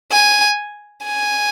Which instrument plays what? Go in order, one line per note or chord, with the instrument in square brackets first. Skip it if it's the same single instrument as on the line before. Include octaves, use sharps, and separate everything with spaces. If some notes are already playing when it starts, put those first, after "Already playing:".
[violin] G#5
G#5